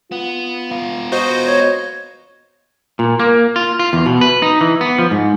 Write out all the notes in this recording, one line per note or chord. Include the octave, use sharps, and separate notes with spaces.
B3 F4
B3 F5
F#4 C5 D#5
C#5
A#2
A#3
F4
F4
E2
B2
B4
D#4
E3
B3
F3
G#2